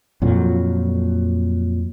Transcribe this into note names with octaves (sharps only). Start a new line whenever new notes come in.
F2 A#2 F3 F#3